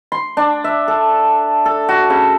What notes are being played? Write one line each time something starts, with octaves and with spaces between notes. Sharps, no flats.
C6
D4
E5
A4
A4
F#4
C#3